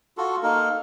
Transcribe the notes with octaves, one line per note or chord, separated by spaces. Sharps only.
F4 F#4 A4
A#3 D#4 A4 A#4